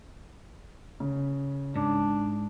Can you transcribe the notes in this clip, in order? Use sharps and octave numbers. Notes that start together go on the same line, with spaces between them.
C#3
G#2 D4